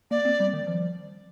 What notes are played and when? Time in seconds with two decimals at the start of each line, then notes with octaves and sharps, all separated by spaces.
0.10 A#3 D5
0.25 C4
0.40 G3
0.53 D#3
0.67 F3